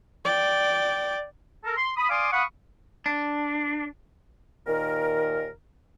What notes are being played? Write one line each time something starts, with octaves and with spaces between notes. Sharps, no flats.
D5 G5
A4 A#4
C6
B5 D#6
D5 F5 G#5 C6 D6 D#6
F5 F#5 B5 C#6 D#6
D4
D#2 A#2 D#3 A#4